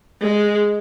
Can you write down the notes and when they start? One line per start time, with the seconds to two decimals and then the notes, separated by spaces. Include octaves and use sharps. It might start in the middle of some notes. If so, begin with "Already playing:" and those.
0.22 G#3